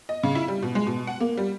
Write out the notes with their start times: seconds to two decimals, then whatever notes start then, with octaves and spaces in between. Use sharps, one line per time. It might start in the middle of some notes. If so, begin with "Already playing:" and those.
0.09 D#5
0.23 C#3
0.35 E4
0.48 G3
0.62 B2
0.75 G#3
0.87 B2
1.07 F#5
1.20 A#3
1.37 G3